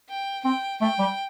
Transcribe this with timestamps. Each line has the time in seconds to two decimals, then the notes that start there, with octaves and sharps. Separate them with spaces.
0.09 G5
0.44 C4 G5
0.81 A3 G5
0.99 G3